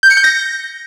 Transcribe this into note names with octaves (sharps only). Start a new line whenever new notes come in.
G6
C#7
G6
A#6